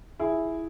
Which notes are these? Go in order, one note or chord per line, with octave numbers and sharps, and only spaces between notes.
E4 G#4